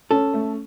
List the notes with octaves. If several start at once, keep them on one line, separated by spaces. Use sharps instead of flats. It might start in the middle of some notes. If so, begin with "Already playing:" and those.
C#4 A4
A3